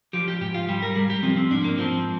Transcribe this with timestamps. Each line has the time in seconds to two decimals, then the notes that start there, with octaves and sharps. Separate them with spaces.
0.13 F3 G4
0.28 G4
0.41 G#2 G4
0.54 F4
0.69 G3 G4
0.83 A#4
0.95 G3 G#4
1.10 G4
1.23 F3 C4
1.37 C4
1.50 G#2 D4
1.64 A#3
1.78 F3 C4